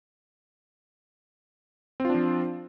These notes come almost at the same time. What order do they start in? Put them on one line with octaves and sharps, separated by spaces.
C4 F4 D4 F3